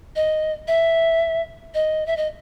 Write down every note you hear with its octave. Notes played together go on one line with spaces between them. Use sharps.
D#5
E5
D#5
E5
D#5